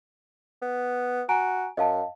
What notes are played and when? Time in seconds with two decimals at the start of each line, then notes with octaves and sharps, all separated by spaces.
0.62 B3
1.29 F#4 G#5 A#5 D7
1.77 F#2 D#5 F5 A5